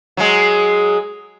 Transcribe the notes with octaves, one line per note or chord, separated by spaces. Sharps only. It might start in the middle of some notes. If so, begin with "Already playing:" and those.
F#3 G#3